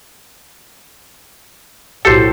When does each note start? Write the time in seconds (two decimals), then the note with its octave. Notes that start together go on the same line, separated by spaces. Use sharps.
2.05 B1 A2 F#4 G4 A4 C5